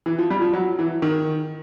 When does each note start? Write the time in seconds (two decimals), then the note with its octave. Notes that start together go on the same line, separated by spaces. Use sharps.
0.06 E3
0.19 F3
0.30 G3
0.41 F3
0.54 F#3
0.79 E3
1.02 D#3